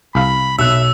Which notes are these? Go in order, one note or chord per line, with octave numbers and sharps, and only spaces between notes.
C2 F5 B5
B1 E5 E6 F#6